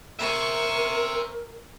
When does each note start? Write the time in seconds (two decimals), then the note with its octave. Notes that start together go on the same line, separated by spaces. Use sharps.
0.19 A#4 C5 E5 G#5 C#6